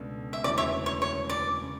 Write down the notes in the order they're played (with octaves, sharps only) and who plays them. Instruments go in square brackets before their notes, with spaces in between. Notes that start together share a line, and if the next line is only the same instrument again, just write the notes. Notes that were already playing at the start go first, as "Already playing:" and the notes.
Already playing: [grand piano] C#2 B2 A3 D4
[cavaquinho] E5
[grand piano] E1 D2 C#3 E3 [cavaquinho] D5
[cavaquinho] C#5 E5
C#5
C#5
D5
[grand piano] C#3